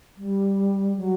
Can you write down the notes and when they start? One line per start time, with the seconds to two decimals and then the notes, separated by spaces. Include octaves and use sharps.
0.17 G3
0.96 F#3